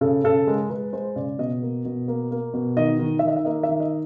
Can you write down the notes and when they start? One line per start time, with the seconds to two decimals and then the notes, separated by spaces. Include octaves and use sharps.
0.01 C#3 A4
0.24 C#3 A4
0.47 G#3 A#4
0.70 G#3 B4
0.93 G#3 C5
1.16 C#3 D5
1.39 B2 D#5
1.62 A#3
1.85 B2
2.08 A#3
2.31 A#3
2.54 B2
2.77 D#3 D#5
2.99 D#3
3.19 E5
3.23 D#3
3.28 D#5
3.36 E5
3.45 A#3 D#5
3.63 E5
3.69 D#3
3.80 D#5